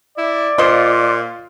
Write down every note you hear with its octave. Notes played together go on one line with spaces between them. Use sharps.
E4 D5
A#2 F4 C5 D#5 C6